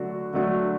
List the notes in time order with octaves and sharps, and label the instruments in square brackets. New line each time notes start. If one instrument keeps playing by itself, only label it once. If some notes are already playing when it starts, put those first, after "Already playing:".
Already playing: [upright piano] D3 F#3 A3 D4 F#4
D3 F#3 A3 D4 F#4